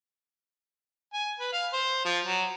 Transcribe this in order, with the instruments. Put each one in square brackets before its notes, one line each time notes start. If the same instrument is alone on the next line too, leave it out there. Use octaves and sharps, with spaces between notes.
[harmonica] G#5
B4
F5
C5
F3
F#3